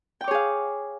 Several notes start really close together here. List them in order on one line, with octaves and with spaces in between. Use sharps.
G5 D6 C#5 G#4 F5